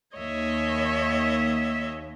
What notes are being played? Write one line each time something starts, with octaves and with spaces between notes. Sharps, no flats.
D#2 C#5 D#5 E5